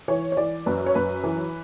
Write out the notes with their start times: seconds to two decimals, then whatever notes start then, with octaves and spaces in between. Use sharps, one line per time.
0.08 E3 C#5
0.32 C#5
0.37 E3 D5
0.66 F#2 B4
0.86 C#5
0.95 F#2 B4
1.24 E3